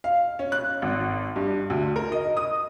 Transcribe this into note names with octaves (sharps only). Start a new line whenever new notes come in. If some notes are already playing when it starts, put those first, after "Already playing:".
F5
C#4
F#6
G#1
G2
D2
A#4
D#5
D#6